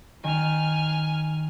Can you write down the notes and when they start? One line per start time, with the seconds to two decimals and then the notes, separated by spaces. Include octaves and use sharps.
0.24 D#3 G#5 F6